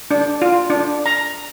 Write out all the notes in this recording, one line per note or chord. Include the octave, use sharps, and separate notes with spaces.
D4
F4
D4
A#5